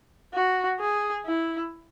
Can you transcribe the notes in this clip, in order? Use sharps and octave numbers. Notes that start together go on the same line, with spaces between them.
F#4
G#4
E4